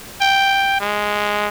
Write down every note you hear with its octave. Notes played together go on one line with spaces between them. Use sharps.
G5
G#3